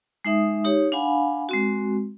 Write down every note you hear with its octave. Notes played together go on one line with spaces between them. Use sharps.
G#3 D#4 E5 D#6
D#4 G4 C#5
D4 F5 F#5 G#5 B5
G#3 C4 F#4